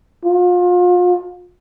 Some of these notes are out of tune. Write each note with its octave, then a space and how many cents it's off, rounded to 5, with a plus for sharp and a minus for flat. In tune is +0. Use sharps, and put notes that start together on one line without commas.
F4 +35